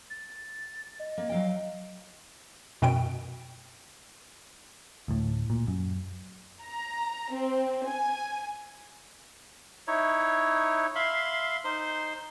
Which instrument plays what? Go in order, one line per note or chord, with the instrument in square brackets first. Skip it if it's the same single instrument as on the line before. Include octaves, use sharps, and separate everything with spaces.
[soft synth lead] A6
D#5
[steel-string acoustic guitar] A#3
F#3 F5 G5
[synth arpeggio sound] F#2 B2 G5 D7
[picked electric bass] D2 A2
A#2
F#2
[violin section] A#5
C4
G#5
[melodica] D#4 E4 C#5
E5 F5 B5 C6
D#4 C5 C6